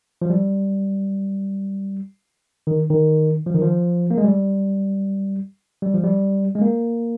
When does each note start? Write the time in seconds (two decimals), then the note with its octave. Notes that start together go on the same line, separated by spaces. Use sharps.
0.22 F3
0.30 G3
2.67 D#3
2.90 D#3
3.46 F3
3.54 D#3
3.62 F3
4.11 A#3
4.18 G#3
4.24 G3
5.82 G3
5.94 F3
6.04 G3
6.55 G#3
6.61 A#3